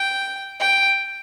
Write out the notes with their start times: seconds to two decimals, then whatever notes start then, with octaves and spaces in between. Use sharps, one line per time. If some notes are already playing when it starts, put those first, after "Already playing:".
Already playing: G5
0.60 G5